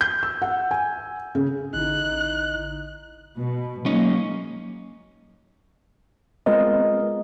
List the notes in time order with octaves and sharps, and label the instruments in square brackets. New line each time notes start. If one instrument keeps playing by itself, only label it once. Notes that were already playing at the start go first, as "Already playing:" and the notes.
[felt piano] G6
E6
F#5
G#5
C#3
[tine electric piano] A1 D3 E4 [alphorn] D#4 [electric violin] F#6
[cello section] B2
[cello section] F#3 G#3 A#3 [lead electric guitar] C#4 D#4
[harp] G#3 F4 [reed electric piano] B3 C4 A#4 [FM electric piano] D#5